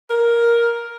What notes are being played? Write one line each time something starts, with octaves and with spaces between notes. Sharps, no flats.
A#4